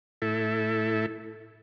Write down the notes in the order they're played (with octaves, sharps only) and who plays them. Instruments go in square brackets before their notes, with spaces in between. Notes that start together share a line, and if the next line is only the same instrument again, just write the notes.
[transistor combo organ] A2 E4 A4